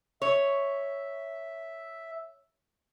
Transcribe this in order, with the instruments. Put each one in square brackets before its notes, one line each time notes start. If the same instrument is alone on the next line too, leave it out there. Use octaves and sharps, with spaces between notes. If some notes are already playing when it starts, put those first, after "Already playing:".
[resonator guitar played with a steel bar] C#5 [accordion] E5